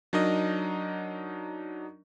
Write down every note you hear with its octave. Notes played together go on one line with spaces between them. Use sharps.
F#3 D4 D#4 A#4 D#5